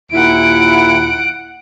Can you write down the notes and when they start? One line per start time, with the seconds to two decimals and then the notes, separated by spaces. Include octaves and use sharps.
0.12 D#2 A#2 E4 F#5 D7